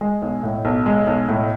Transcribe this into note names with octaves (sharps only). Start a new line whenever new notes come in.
G#3
B1
A2
B1
G#3
B1
A2